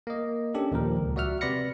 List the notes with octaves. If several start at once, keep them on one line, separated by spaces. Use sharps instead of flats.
A#3 D#5
C#4 D4 G4 A4
D#2 A#2 F3 A#4
C#2
F#4 D5 E5 F#5 F6
C3 B4 D5 B5 A#6 C#7